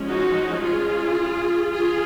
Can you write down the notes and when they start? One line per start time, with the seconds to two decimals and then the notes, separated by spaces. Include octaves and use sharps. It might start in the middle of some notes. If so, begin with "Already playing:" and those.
Already playing: F3 G#3 C#4
0.08 D#4 F#4
0.62 F4 G#4
1.72 F3 F4 G#4